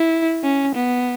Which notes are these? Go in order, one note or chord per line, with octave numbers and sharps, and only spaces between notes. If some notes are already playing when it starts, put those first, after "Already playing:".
Already playing: E4
C#4
B3